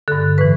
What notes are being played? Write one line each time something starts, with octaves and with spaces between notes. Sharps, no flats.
G2 D3 A4
A2 E3 B4